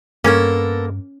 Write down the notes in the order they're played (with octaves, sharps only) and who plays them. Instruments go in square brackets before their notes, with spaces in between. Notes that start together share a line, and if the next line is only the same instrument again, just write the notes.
[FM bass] G2 [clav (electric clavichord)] A#3 [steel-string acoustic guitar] B3 A4 A#4 [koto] C#4